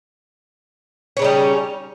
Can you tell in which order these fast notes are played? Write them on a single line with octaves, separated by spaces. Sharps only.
C#4 C#3 D#4 G3